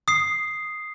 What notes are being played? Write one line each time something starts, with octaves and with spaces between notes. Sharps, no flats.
D#6 C7